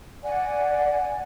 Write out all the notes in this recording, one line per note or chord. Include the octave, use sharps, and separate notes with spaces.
D5 F#5 G#5